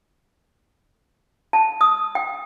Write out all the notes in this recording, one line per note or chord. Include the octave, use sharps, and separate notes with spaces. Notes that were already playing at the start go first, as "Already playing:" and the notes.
A5
D#6
G5